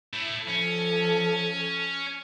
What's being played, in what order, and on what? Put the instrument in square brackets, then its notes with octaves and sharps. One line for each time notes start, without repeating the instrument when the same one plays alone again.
[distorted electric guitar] A3 E4
[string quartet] F3 A4 [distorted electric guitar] C#4